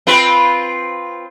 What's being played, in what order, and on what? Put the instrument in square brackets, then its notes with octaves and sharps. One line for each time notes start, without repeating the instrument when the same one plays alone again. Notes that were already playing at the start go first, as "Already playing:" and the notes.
[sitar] C4 F4 B4